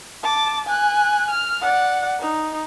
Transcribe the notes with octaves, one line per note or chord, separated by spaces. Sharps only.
A5 D6
G#5 F#6
F6
D5 F#5
D#4